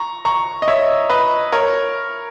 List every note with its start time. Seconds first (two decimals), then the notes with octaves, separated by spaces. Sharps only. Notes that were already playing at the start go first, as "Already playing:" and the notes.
Already playing: A#5 C#6
0.25 A#5 C#6
0.62 D#5
0.68 C#5 E5
1.10 B4 D#5
1.52 A#4 C#5